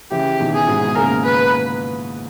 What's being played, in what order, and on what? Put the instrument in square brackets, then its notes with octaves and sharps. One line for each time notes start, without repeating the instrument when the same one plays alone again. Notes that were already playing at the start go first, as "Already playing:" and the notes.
[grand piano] C#3 E3 [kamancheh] G4
[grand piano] B2 D#3
[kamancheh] G#4
[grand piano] G#2 B2
[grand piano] A#2 C#3 [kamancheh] A#4
[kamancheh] B4